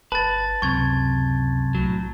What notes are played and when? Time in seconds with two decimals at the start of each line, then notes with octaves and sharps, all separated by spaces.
0.12 G1 B4 A5 A6
0.62 C#2 F#2 C3 C#6 G#6
1.75 C2 A2 F#3